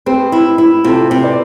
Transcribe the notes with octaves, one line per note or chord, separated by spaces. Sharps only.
C4 G4 B4
E4
E4
C3 F4 A4
C3
B4 D5